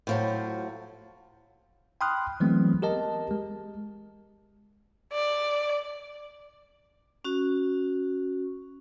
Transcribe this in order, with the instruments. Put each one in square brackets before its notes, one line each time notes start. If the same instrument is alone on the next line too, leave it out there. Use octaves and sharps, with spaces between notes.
[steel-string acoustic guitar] A2 F3 F#3
[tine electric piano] G5 B5 C6 D#6 F6 F#6
E3 F#3 G#3 A3 B3 C4
G4 A#4 D#5 A5
G#3
[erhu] D5
[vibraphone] C#4 F#4